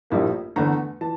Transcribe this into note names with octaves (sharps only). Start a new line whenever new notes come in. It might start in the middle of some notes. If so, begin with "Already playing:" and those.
A#1 A2 G3 A#3
E2 D3 A3 A#5
E3 A5